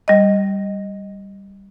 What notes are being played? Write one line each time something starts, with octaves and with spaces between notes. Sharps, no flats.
G3 D#5